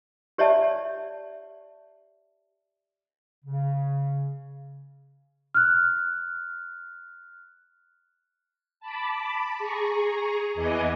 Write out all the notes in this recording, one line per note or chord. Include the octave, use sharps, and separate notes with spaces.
G4 C#5 D5 E5 A5
C#3
F6 F#6
A5 B5 D6
G#4 A#5 C#6
E2 E3 B3 D#5 G#5 D6